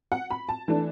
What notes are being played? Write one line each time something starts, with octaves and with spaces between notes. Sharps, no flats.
F#5
B5
A5
E3 A3 D4